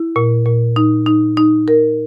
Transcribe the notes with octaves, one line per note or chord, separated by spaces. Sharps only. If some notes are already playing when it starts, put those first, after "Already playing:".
Already playing: E4
A#2
A#2
D#4
D#4
D#4
A#4